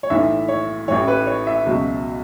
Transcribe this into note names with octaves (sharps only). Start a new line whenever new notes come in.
C#5
B1 A2 E3 E5
C#5
A1 A2 E3 C#5
B4
C#5
E5
C#2 B2 F#3